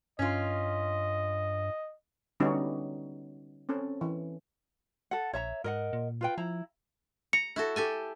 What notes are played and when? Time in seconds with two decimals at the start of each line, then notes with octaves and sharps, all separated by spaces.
0.19 G2 C#4 F4 D#5
2.40 D3 G3 B3 C#4 D#4 F#4
3.69 C4 C#4 A4
4.01 E3
5.11 A4 F#5
5.33 A#1 C#5 E5 A#5
5.64 G#2 A#4 D#5 F#5
5.93 A#2
6.21 F4 B4 G5
6.38 F3 E4 A#5
7.33 A#5 C#7
7.56 E4 F#4 A4
7.76 G4 A4 G#5